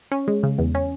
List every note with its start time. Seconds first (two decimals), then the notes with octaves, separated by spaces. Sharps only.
0.12 C#4
0.28 G#3
0.43 C#3
0.58 E2
0.75 C#4